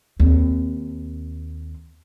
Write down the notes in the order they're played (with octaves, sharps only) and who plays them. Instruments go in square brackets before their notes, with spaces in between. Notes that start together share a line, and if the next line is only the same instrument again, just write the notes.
[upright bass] D#2 C4